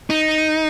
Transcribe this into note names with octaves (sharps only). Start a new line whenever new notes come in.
D#4